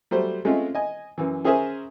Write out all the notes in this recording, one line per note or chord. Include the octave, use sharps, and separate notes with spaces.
F#3 G3 A3 C5
G#3 A3 C4 C#4 F4
D#5 G#5
F#2 E3
C#4 G#4 A#4 C5 E5 G#5